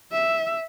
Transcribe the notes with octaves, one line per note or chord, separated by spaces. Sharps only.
E5